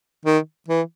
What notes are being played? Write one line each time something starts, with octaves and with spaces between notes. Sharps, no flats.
D#3
E3